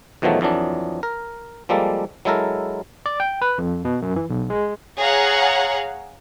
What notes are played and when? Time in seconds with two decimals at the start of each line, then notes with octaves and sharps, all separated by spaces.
0.22 E2 B2 D#3 F3 F#3 A3
0.41 F2 E3 F#3 D4
1.03 A#4
1.69 F3 G3 G#3 A#3 A4
2.25 F#3 G#3 E4 A4 A#4
3.06 D5
3.20 G5
3.42 B4
3.58 F2
3.85 B2
4.02 F#2
4.16 E3
4.30 B1
4.50 G#3
4.99 G#4 C#5 F5 F#5 A#5